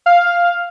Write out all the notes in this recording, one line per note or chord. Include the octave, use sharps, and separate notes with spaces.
F5